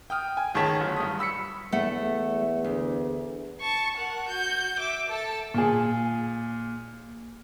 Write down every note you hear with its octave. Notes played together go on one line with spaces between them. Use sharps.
G5 D#6 F6
G#5
A1 D#3 G#4 C#5 A5 B6
G1 F#2
G2 D#6
B5 E6 B6 C#7
E2 A3 F#5
D2
A5 C#6
A#4 F#5
F#4 G6
E5 D6
A4 A5
A#2 G#4